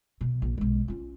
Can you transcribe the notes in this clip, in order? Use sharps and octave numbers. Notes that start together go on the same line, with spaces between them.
B2
A#1
B1 G#3
C#4 F4